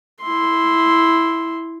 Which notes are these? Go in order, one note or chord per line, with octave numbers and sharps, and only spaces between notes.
E4 C6